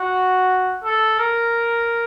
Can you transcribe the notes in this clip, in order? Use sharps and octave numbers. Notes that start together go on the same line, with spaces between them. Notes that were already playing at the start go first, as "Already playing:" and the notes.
Already playing: F#4
A4
A#4